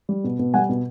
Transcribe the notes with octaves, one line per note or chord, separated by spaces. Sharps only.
G3
B2
B2
G3 F#5 G#5
B2